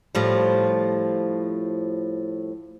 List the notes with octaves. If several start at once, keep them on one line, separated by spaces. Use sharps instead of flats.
A2 F3 G3